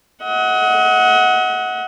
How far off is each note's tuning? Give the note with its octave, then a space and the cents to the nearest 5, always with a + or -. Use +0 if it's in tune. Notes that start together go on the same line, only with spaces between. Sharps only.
D#5 +40 F#5 +0